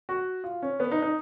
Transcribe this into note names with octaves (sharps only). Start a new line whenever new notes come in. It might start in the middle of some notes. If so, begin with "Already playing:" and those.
F#4
F4
C#4
B3
D#4
D#4